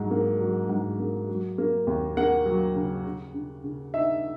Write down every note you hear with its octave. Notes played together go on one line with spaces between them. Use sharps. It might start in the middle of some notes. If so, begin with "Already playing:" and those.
Already playing: G#2 F#3
A#3
F#3
G#2
A#3
F#3
A#3
D#2
A#3 F#5
F#3
C#3
C#3
C#3
C#3
D#4 E5